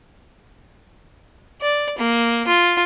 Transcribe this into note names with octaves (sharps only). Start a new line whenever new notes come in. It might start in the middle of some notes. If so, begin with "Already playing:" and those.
D5
A#3
F4